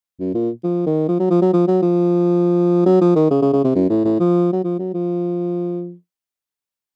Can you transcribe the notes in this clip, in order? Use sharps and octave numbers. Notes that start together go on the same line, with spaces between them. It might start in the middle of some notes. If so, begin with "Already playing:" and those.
F#2
A#2
F3
D#3
F3
F#3
F3
F#3
F3
F#3
F3
F#3
F3
D#3
C#3
C#3
C#3
C3
F#2
A2
A2
F3
F#3
F3
F#3
F3